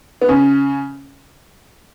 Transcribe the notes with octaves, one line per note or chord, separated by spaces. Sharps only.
B3
C#3 C#4